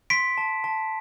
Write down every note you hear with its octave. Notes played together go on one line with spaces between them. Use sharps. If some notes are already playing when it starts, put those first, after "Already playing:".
C6 B6 D7
A5
A5